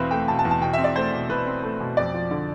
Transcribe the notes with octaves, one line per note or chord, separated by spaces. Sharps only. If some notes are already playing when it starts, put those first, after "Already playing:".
Already playing: E2 B2 C4 B4 E5 F5
A3 G5
B2 A5
A5
E2
A5
B2 G5
E5
C4
D5
A3 C5
B2
B2 B4
C4
A3
B2
F2 D5
F3
D3